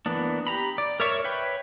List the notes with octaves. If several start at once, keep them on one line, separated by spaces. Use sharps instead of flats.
E3 A#3 B3 D4
G4 A#5 B5
D5
A#4 C#5 D5 E5 C#6
B4 C#5 E5 G5 B5